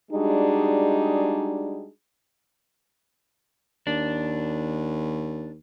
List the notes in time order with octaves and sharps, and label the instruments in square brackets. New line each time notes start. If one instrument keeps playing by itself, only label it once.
[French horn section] G3 G#3 D4 D#4 F#4 G#4
[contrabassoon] D#2 [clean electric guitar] D4